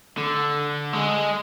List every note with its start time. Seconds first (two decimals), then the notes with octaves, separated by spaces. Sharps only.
0.17 D3
0.93 G#3